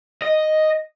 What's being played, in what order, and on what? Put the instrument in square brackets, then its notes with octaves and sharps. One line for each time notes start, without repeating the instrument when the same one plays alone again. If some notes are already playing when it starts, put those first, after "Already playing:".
[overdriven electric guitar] D#5